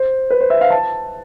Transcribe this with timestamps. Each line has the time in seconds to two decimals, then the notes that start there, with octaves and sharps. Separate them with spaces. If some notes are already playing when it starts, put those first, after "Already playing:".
Already playing: C5
0.30 B4
0.41 C5
0.50 E5
0.61 F5
0.70 A5